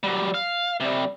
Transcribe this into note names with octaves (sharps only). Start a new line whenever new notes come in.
F#3 G3
F5
C3 G3